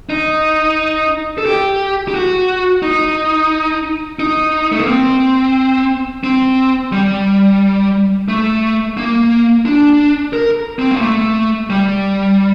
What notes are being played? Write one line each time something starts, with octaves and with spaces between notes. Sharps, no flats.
D#4
A4
G4
G4
F#4
D#4
D#4
A3
A#3
C4
C4
G3
A3
A#3
D4
A#4
C4
A#3
A3
G3